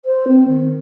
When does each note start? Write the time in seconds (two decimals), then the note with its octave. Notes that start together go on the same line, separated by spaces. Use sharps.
0.05 C5
0.27 C4
0.47 D#3